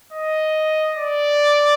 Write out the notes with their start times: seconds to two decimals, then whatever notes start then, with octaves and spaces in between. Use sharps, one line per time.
0.13 D#5
0.97 D5